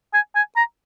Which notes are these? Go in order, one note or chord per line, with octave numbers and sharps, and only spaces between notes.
G#5
G#5
A#5